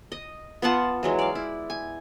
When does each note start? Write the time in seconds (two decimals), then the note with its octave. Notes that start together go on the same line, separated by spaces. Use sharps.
0.12 D#5
0.62 B3 F4 F#5 A5
1.03 E3 F#3 G#3
1.19 D5 F5
1.35 E4
1.70 G#5